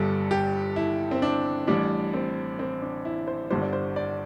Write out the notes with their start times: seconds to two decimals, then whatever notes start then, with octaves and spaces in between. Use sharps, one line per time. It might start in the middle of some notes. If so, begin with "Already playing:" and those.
Already playing: G1 G2 G3 A4
0.31 G4
0.76 E4
1.11 C4
1.22 D4
1.67 A1 A2 G3 D4
2.14 C4
2.59 C4
2.82 D4
3.05 E4
3.27 C5
3.50 G1 G2 D3 G3 C5
3.62 D5
3.73 C5
3.96 D5